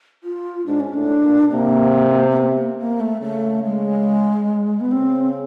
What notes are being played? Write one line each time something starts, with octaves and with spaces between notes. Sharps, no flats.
F4
G#2 D4
C#4
A2 D4
A#2
C3 A#3
A#3
B3
A#3
A#3
A3
C#3 A3
G#3
B3
C#3 C4